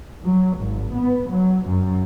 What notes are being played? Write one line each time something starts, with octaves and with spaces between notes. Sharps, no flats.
F#3
G#1
B3
F#3
F#2